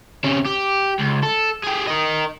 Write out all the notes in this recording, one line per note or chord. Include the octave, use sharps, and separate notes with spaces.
C3 C#4
G4
C#2
A4
G4 G#4
A#4 D#5